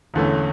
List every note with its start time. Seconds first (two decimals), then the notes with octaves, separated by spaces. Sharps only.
0.14 E1 E2 D3 A3 C#4